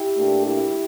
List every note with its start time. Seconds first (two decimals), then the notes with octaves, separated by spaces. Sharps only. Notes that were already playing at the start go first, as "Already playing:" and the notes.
Already playing: E4 G4
0.17 A#2 A3 D4
0.45 E4 G4